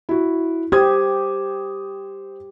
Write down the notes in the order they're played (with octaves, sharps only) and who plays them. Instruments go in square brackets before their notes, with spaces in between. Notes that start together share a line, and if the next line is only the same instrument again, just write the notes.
[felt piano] E4 F#4
[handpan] G4 [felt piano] C5 D#6 G#6